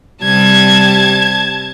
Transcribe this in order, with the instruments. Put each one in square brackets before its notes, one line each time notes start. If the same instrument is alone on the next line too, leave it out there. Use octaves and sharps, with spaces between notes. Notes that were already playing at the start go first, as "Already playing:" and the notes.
[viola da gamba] C3 G3 [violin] A5 G#6